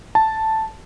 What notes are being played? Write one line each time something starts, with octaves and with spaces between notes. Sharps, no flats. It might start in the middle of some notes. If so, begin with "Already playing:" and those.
A5